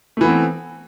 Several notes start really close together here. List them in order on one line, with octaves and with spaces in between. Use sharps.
A3 E3 B3 C4